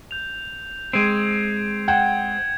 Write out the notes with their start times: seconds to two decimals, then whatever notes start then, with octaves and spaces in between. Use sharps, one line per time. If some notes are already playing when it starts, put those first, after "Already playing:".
0.11 G6 F7
0.93 G#3 C4 G6 G#6 E7
1.88 F#5 G5 G#6 E7